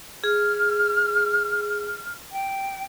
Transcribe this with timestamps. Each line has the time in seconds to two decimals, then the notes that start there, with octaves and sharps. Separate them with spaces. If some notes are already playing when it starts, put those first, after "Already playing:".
0.24 G#4 F6
2.31 G5